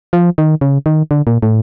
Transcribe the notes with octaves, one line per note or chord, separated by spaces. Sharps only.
F3
D#3
C#3
D#3
D3
A#2
A2